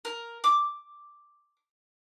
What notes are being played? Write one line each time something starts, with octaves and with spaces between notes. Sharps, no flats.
A#4
D6